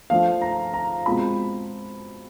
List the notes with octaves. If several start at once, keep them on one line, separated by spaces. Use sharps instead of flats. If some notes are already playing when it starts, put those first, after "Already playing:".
F3 A3 D4 F5
A#5
A#5
B2 G#3 C4 F4 B5